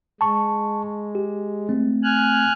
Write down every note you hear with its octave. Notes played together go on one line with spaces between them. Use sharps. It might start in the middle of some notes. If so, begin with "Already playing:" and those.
G#3 A5 C#6
G4
A3 C4
G#5 F6 F#6